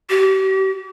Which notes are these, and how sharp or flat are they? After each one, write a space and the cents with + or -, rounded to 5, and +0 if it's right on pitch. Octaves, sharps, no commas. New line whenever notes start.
G4 -40